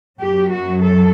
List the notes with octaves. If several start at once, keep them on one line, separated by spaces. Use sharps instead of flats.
F#2 F#3 G4
F#4
A4